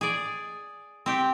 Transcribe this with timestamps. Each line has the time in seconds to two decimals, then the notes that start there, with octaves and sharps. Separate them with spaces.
0.01 G#4 D5
1.06 C4 G4